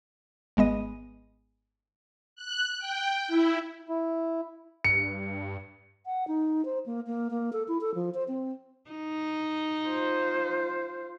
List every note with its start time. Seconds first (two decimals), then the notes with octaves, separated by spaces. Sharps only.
0.57 G#1 G#3 B3 D#5
2.35 F#6
2.78 G5
3.27 E4
3.89 E4
4.84 G2 C#7
6.06 F#5
6.28 D#4
6.65 C5
6.86 A#3
7.07 A#3
7.31 A#3
7.53 A4
7.68 E4
7.81 A4
7.95 F3
8.14 C5
8.28 C4
8.90 D#4
9.85 F4 C5